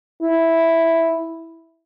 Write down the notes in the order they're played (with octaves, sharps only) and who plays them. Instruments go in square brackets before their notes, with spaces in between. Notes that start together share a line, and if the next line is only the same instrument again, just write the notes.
[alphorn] E4